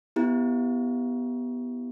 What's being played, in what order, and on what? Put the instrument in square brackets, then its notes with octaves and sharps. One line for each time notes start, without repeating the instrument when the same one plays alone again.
[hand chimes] B3 E4 G4